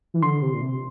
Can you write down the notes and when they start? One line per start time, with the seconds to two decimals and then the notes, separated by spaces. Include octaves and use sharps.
0.14 E3
0.22 D3 C6
0.41 C3
0.54 A#2
0.61 C3